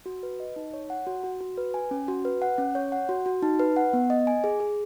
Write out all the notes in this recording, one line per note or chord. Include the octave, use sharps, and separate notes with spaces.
F#4
B4
D#5
D#4
C#5
F#5
F#4
F#4
F#4
B4
G#5
C#4
F#4
B4
F#5
C#4
C#5
F#5
F#4
F#4
D#4
B4
F#5
B3
D#5
G#5
G#4
G#4